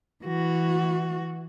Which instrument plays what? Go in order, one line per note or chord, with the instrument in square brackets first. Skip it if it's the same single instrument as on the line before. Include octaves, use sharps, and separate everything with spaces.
[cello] E3 F#4